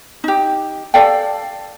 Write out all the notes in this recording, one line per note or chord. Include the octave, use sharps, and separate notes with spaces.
D#4 G4
A4 D5 F5 G5